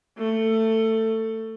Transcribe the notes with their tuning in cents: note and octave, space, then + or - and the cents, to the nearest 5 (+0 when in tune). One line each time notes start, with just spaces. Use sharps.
A3 +20